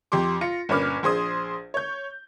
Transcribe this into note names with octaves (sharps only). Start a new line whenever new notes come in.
F2 G4 C6 D6
F4 A#6 C#7
G1 A#2 C#4 B5 D6 F6
A#1 G#4 C5 D#6
C#5 G6